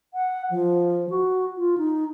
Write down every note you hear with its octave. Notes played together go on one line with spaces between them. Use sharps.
F#5
F3
F#4
F4
D#4